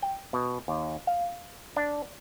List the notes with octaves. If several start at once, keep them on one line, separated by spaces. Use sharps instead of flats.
G5
B2
D#2
F5
D4